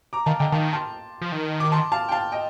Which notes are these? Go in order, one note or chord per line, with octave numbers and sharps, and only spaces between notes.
A#5 D6
D#3 F5 A5
D3 D#5 G5
D#3 F5 A5
A5 C6
F3
D#3
D6
A5 C6
F5 A5
G5
F5 A5
D#5 G5